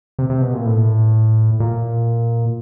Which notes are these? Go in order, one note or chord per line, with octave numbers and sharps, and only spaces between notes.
C3
C3
B2
A#2
A2
A#2